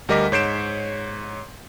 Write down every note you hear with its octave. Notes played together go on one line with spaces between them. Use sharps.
D2 G3 A#4 D#5 D6 B6
G#2 C#5 G6 C7 D7 E7